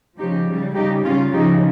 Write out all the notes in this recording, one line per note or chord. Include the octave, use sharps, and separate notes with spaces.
C#3 F3 D#4 G4
C#3 G3
C#3 G3 D#4 G4
C#3 G3 C#4 F4
C#3 F3 D#4 G4